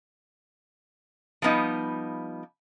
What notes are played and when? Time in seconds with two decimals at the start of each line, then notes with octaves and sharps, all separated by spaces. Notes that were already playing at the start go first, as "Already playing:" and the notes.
1.42 F3 G3 B3 D#4